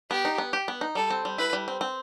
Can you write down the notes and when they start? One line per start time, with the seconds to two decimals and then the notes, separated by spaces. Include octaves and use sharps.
0.11 B3 G4
0.25 D#4
0.38 B3
0.53 G4
0.68 B3
0.81 D#4
0.95 G3 A4
1.10 C4
1.25 G3
1.38 E4 B4
1.53 G3
1.68 C4
1.81 C4